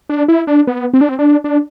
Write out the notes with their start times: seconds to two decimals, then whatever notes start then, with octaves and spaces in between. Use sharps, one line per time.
0.09 D4
0.28 E4
0.47 D4
0.67 B3
0.94 C4
1.01 D4
1.09 C4
1.19 D4
1.44 D4